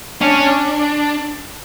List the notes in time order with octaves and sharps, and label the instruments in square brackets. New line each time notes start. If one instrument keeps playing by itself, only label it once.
[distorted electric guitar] C#4 [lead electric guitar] D4